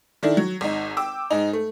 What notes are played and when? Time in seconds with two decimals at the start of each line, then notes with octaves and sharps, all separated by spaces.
0.23 D#3 D4 E4 A4
0.37 F#3
0.61 G#1 D#4
0.97 G5 D6 E6
1.30 G#2 D#4
1.53 A3